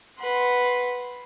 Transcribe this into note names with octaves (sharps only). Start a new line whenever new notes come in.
B4 F#5 C6